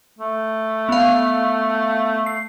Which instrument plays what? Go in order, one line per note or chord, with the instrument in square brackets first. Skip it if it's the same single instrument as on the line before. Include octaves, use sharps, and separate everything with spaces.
[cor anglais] A3
[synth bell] B3 F5
C7